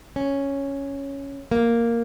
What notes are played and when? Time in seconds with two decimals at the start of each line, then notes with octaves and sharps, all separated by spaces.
0.16 C#4
1.51 A#3